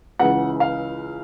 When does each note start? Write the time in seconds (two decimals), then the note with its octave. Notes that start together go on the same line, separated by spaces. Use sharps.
0.19 C#2 C#3 E3 F#5
0.60 F5